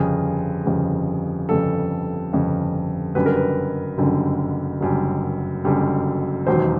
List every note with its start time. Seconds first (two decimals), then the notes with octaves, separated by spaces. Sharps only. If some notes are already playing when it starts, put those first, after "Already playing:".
Already playing: G1 F2 C#3 G#4
0.66 G1 F2 C#3
1.49 G1 F2 C#3 A4
2.33 G1 F2 C#3
3.15 F#1 F#2 D3 G3 B4
3.26 A#4
3.36 B4
3.98 F#1 F#2 D3 G3
4.81 F#1 F#2 D3 G3
5.64 F#1 F#2 D3 G3
6.47 E1 D#2 D#3 F#3 C5